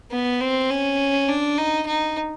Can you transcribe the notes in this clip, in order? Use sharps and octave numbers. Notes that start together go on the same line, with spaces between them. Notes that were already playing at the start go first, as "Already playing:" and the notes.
B3
C4
C#4
D4
D#4
D#4